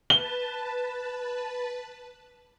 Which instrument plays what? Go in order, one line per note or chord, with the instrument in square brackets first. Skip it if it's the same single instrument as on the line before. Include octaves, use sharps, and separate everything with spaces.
[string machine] B4 A5 [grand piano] G7